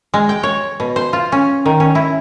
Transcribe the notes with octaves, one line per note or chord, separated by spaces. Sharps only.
G#3
G5
C#5
B2
C5
F4
C#4
D#3
C#4
E4